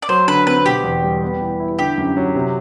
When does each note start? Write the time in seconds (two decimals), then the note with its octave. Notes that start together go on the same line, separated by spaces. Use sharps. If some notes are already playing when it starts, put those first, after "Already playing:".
0.02 D5
0.09 F#3 C5
0.28 D3 B4
0.47 C4 B4
0.65 B2 G4
0.84 E2
1.03 G3
1.23 B3
1.41 E3
1.60 E4
1.79 D3 G4
1.98 F#2
2.17 F#3
2.35 C3